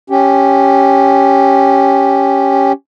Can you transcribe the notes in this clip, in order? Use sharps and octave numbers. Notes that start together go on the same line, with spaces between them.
C#4 G4